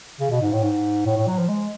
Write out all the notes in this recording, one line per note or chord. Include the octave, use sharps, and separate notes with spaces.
C#3
B2
G#2
A2
G#2
A2
A2
F#3
F3
G#3